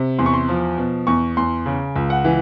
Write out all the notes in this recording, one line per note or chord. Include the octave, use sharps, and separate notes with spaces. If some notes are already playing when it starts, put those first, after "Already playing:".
Already playing: C3
E2 C6
C#6
C6
F3
B2
E2 C#6
E2 C6
C#3
C#2
F#5
E3